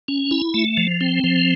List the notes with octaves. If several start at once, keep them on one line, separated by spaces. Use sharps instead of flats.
C#4
E4
A3
F3
C4
F3